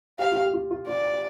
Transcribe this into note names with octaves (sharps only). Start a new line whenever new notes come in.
G4 F5
F4
G4
G4
F4
F4
F4 D5